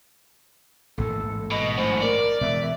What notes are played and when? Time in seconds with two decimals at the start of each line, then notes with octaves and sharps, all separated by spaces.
0.98 A1 G#2 A#3 A4
1.52 B2 D#5
1.77 F#2 A2 C5
2.01 A#4 D5
2.41 B2 E3 G#3 E5